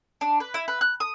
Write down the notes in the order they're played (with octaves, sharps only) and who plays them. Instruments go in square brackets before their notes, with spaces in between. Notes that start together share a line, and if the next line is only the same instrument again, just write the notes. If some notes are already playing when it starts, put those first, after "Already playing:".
[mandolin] D4
B4
E4
B4
F#6
D#6